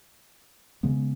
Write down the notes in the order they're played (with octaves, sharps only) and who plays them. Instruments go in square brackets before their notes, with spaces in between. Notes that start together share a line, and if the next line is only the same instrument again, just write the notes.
[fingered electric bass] C#3 G#3 B3